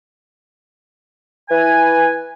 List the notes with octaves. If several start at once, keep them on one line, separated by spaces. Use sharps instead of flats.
E3 B4 G#5